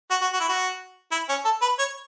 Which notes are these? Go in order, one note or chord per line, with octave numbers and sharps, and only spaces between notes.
F#4
F#4
F#4
E4
F#4
E4
C#4
A4
B4
C#5